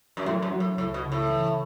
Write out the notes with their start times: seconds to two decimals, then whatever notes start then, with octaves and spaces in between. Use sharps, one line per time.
0.17 F#2
0.25 A2 F#3
0.42 F#2
0.51 F#3
0.60 A2
0.77 C#2 A2
0.94 B2
1.04 C#3
1.12 A2
1.30 E3